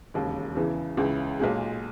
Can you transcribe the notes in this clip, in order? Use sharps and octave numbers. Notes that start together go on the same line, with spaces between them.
E1 D#2 C#3
E2 C#3 E3
C#2 C#3 E3
B1 A#2 G#3